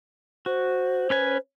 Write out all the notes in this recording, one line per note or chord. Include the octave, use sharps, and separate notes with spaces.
F#4 C5
C#4 B4 G#5